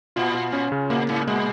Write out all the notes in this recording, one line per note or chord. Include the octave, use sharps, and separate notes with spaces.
A#2 F4
F4
C#4
C#3
A#2 A#3
G#2 A#3
A#2 G#3